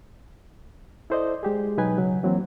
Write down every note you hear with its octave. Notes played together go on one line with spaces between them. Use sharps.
E4 A4 C5 D5 D#5
G#3 G4 G#4
B2 F#3 D#4 B4 G#5
C#3 F#3
E3 F#3 A#3 C4